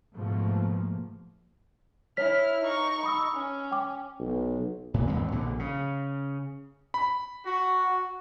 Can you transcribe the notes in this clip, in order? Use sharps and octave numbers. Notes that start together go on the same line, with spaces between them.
G#2 B2 F3 A3 A#3
E4 C#5 F6 B6
D#4 C#6
B5 D#6 E6
C#4
G5 D6
B1
A2 E3
D#2 G#2 G#3 C4
A#1 B2 D3
C#3
B5
F#4